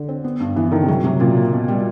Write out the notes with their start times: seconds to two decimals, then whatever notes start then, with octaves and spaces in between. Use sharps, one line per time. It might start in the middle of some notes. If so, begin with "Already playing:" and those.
Already playing: D3
0.09 C4
0.24 B3
0.40 G2
0.56 E3 B3
0.72 D3 D#3
0.83 C3
0.88 C#3 F#3
1.04 C3 F#3
1.20 A#2 C#3
1.37 A#3
1.53 B2
1.68 G3